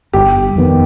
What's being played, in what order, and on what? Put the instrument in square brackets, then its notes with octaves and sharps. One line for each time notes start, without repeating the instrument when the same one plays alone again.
[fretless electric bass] G1 [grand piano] G4
[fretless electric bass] F2 D#3 B3